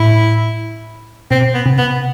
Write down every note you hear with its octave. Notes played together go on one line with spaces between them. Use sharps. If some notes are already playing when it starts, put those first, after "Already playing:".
Already playing: A2 E4
B2 C4
B3
C3
B3